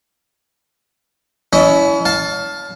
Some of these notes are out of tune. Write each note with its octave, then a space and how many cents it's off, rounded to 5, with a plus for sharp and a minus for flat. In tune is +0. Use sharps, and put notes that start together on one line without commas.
C#4 +35 E4 +0 D#5 +0
F5 +15 A5 +0